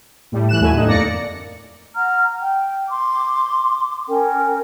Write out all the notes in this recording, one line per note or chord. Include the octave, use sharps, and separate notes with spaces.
A2 G3
E3 F#6 E7
D#2 F#3 A3 E4 G#5
A2 D3 D#4
F2 A#3 D5 A#6 C#7
F#5 A#5 F6
G5
C6 D6
C#4 A#4 G5